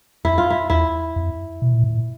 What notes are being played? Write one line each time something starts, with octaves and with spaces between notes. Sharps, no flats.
F2 E4
F4
E4
E2 E4
F2
B2
A#2
A2
A#2